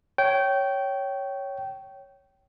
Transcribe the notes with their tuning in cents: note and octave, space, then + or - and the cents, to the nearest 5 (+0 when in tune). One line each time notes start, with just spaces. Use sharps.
C#5 +0 G5 -20